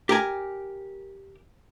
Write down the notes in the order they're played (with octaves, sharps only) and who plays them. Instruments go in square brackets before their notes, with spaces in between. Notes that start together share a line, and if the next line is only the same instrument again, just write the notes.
[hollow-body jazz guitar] G4 A#4 G#5